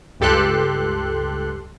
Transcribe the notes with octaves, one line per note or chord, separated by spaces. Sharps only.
C#2 G2 G4 A4 C6 F#6